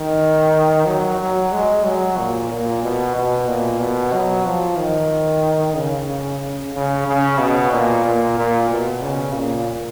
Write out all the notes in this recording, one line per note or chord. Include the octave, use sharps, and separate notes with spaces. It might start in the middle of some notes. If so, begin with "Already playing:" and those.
Already playing: D#3
F#3
F#3
G#3
F#3
A#2
A#2
B2
B2
A#2
B2
F#3
F3
D#3
C#3
C#3
C#3
B2
A#2
A#2
A#2
B2
C#3
A#2